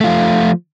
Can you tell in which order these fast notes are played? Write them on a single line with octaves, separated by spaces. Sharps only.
A3 F4 F3